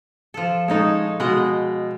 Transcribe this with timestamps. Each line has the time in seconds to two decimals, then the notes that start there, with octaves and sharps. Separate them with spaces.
0.34 F3 A4
0.68 G#3 D#4 A4 C#5
1.20 B2 G#3 D#5